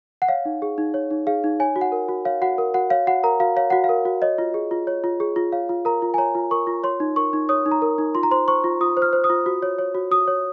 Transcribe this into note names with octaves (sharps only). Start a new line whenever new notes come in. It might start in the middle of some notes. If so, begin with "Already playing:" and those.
F#5
C#5 F5
D#4
G#4
D#4
C#5
D#4
G#4 F5
D#4
C#5 G#5
F#4
F#5
A#4
F#4
C#5 F5
F#4 F#5
A#4
F#4 F#5
C#5 F5
F#4 F#5
A#4 A#5
F#4 F5
C#5 F5
F#4 F#5
F5
A#4
F#4
C#5 D#5
F4
G#4
F4
C#5
F4
G#4
F4
C#5 F5
F4
A#4 A#5
F4
G#5
C#5 A#5
F4
A#4 C#6
F4
C#5 C6
D#4
A#4 C#6
D#4
C#5 D#6
D#4
A#5
A#4
D#4
F4 C6
A#5
C5 C6
C5 C#6
F4
F4 D#6
C5
F6
C5
D#6
F4
F#4
C#5
C#5
F#4
F#4 D#6
C#5